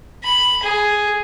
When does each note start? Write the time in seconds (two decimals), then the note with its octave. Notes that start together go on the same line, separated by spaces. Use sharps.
0.24 B5
0.63 G#4